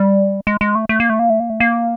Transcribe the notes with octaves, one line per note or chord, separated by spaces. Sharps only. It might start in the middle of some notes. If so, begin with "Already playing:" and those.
Already playing: G3
G#3
G#3
A3
A3
A#3
A3
A#3
A3
A#3
A3
A#3